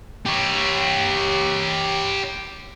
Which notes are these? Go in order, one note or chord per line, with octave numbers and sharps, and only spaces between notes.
G4 C#5